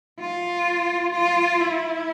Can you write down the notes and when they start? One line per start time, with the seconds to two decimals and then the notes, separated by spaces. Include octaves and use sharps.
0.20 F4
1.14 F4
1.61 E4